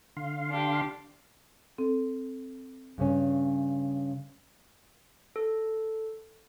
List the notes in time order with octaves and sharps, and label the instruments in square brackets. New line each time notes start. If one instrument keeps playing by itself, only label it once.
[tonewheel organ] D3 F5 C6
[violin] D4 G4
[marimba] C4 A4
[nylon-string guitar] G2 C#3 C#4
[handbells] A4